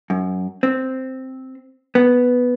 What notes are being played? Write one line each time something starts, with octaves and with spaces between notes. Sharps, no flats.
F#2
C4
B3